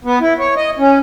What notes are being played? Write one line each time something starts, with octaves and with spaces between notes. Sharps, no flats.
B3
E4
C#5
D#5
C#4